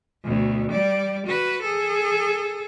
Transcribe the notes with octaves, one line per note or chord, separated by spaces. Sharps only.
D2 B2
G3 D5
F#4 B4
G#4 A4